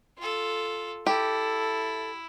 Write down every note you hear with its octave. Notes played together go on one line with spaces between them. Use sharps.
F4 A4
E4 G4 A4